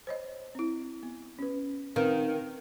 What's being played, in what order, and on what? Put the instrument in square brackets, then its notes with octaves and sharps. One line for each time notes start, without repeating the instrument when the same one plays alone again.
[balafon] C5 C#5 D#5
C4 E4
B3
C#4 B4
[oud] D#3 [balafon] C4 B4 F5